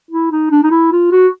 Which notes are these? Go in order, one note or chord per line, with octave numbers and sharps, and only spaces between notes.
E4
D#4
D4
D#4
E4
F4
F#4